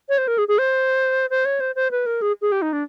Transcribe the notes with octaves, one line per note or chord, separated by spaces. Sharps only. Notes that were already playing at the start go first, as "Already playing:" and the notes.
C#5
C5
A#4
G#4
G#4
C5
C5
C#5
C5
C5
B4
A#4
G#4
G#4
G4
D#4
D4